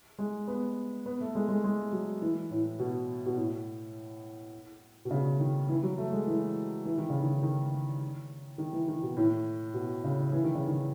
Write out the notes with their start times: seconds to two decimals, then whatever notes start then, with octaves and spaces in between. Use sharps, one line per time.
0.19 G#3
0.48 B3
1.06 B3
1.21 A3
1.35 G#3
1.49 G#3
1.64 G#3
1.92 F#3
2.22 E3
2.50 A2
2.79 B2
3.26 B2
3.37 A2
5.05 B2
5.11 C#3
5.40 D#3
5.69 E3
5.83 F#3
5.98 A3
6.13 G#3
6.27 E3
6.85 E3
6.98 D#3
7.10 C#3
7.22 D#3
7.42 D#3
8.58 D#3
8.73 E3
8.88 D#3
9.03 B2
9.17 A2
9.74 B2
10.04 C#3
10.32 E3
10.44 D#3
10.55 C#3
10.67 D#3